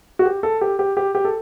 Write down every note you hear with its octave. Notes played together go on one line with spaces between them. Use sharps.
F#4
G4
A4
G4
G4
G4
G4
A4